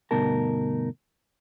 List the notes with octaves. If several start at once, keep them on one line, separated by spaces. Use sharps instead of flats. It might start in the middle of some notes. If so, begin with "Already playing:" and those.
D2 G2 B2 D#4 A#4 A5